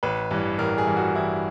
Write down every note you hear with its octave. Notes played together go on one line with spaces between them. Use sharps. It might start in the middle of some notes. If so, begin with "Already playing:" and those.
A1 B4
G2 E3
A1 A#4
G#4
G2 E3
F#4
A1 E4